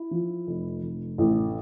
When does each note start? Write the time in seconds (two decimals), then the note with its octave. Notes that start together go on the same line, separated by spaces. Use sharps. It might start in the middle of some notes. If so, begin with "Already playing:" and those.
Already playing: E4
0.11 F3
0.47 F1
0.82 F1
1.18 A1